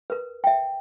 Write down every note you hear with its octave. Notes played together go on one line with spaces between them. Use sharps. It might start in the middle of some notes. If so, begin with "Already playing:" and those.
A#4 B4
E5 G5